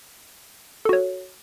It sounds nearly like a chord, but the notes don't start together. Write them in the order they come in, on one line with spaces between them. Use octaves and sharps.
A4 F#4 C#5